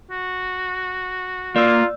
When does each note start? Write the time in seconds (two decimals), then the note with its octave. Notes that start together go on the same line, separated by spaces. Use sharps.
0.10 F#4
1.56 A#3 F4 D5 E6